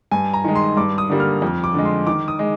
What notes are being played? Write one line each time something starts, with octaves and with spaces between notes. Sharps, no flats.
G2 G#5
A#5
D#3 G#3
C6
G2 D6
D#6
D3 G3 A#3
F6
F2
D6
D3 G#3
C6
D#3 D6
D#6
G#3